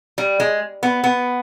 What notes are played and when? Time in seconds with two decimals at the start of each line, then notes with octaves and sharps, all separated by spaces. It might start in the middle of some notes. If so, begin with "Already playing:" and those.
0.18 G3
0.40 G#3
0.83 B3
1.04 B3